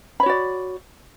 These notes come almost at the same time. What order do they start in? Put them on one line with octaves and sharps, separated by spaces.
B5 C#5 F#4 D5